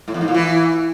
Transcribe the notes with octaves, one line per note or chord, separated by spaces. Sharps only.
A2
E2
G#2
A#2
E3